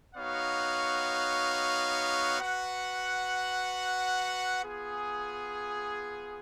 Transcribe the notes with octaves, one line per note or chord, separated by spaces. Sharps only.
B3 D#4 F#4 C#5 F5
F#4 B4 F#5
B3 F4 G#4